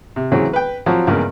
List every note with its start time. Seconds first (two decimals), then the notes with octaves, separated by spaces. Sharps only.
0.16 C3
0.32 C#3 E3 F#3 C4
0.53 B4 G5
0.86 F3 F#3 C4
1.07 E2 G2 C#3 G#3 A#3